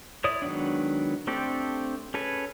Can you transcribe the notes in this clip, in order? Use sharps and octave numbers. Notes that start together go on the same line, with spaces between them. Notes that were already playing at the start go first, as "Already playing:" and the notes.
E4 C#5 D5 D#6
D#3 F#3 G#3 B3 D4
A3 C4 D4 G4 A4
C#4 G#4 A4 B4 G#5